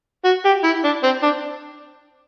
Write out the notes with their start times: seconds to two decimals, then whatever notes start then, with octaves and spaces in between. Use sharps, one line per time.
0.25 F#4
0.45 G4
0.64 E4
0.84 D4
1.03 C4
1.22 D4